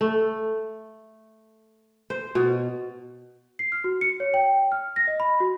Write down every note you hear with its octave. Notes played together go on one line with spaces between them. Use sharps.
A3
C5
B2
C7
F6
F#4
C#7
C#5
G5
F6
A#6
D#5
B5
F#4